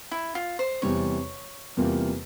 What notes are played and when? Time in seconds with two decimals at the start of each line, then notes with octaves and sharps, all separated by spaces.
0.11 E4
0.35 F4
0.59 C5
0.82 E2 C3 G3 C4 C#5
1.77 E2 C3 G3 A#3 F4